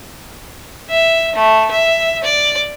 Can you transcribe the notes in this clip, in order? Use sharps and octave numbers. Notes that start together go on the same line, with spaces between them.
E5
A3
E5
D5